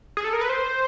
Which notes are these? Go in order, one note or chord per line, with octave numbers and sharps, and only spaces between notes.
G#4
A4
A#4
B4
C5